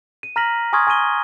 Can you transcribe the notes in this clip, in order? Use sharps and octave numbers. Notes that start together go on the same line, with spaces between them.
D#7
A#5 F6 A#6 B6 F#7
G#5 C6 C#6 D#6 F6 G#6
G#5 C#6 D#6 D#7 G7